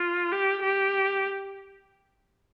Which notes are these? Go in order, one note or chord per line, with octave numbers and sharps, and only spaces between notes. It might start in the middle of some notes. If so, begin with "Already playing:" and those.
Already playing: F4
G4
G4